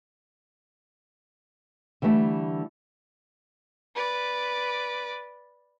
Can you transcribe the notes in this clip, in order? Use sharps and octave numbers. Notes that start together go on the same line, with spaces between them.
D3 E3 G3 A3
B4 D5